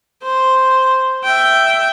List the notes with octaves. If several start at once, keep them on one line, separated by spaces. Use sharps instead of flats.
C5
E5 G5